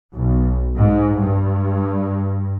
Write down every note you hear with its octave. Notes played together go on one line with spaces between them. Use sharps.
B1
G#2
G2